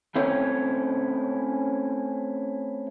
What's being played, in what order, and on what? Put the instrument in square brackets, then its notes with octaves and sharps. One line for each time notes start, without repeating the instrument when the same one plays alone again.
[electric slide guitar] A3 C4 C#4 E4 C5 C#5